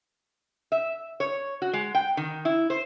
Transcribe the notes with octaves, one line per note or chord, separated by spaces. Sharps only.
E5
C#5
F#4
G#3
G5
D#3
E4
C5